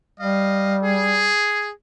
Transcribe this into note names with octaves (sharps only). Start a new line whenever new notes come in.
G3 D#5 F5
G#4